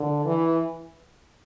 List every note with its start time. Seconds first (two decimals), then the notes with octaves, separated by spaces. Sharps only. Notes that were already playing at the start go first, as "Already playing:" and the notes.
Already playing: D3
0.26 E3